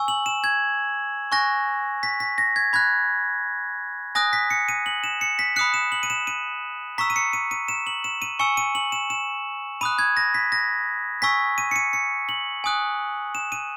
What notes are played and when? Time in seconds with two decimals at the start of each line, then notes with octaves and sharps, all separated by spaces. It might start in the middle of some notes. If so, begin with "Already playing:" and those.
Already playing: G#5 C#6 E6
0.08 F#7
0.26 E7
0.44 G#6
1.32 G#5 C#6 F#6 A#6
2.03 B6
2.20 B6
2.38 A#6
2.56 G#6
2.73 B5 F#6 G#6
4.15 G#5 D#6 F#6 A#6
4.33 B6
4.50 C#7
4.69 D#7
4.86 F#7
5.04 E7
5.21 C#7
5.39 B6
5.56 B5 D#6 F#6 C#7
5.74 E7
5.92 F#7
6.03 D#7
6.10 E7
6.27 D#7
6.98 A#5 C#6 E6 B6
7.10 D#7
7.16 C#7
7.33 D#7
7.51 D#7
7.68 E7
7.87 F#7
8.04 E7
8.22 D#7
8.39 G#5 C#6 E6 C#7
8.57 D#7
8.75 F#7
8.92 E7
9.10 E7
9.81 B5 D#6 F#6 D#7
9.99 G#6
10.17 A#6
10.34 B6
10.52 A#6
11.22 G#5 C#6 E6 B6
11.58 D#7
11.71 C#7
11.76 D#7
11.93 C#7
12.29 F#7
12.64 G#5 D#6 F#6
13.35 E7
13.52 D#7